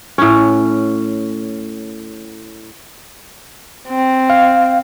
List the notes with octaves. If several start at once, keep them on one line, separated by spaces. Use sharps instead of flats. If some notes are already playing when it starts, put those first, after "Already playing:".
A2 C#4
C4
F5